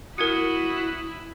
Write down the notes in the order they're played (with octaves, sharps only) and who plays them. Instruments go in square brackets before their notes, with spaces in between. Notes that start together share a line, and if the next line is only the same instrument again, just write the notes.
[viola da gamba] E4 [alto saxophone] F#4 [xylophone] A#4 G#6 C#7 [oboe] D#6